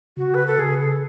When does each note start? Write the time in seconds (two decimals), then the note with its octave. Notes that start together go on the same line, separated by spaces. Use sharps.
0.17 C#3 F#4
0.34 B4
0.47 A4
0.59 C#3 G#4
0.80 A4